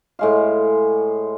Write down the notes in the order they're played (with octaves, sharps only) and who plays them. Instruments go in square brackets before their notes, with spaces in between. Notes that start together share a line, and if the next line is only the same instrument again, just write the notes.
[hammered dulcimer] A2 G#3 F5